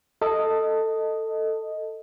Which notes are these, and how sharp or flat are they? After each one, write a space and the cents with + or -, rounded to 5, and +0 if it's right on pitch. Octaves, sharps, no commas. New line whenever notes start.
A4 +15 D#5 +0